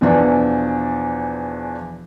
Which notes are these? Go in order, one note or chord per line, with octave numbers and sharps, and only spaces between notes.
E2 B2 E3 F3 D4